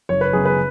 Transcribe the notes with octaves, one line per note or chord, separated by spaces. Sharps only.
F#1 C#5
B4
F#2 C#3 G#4
B4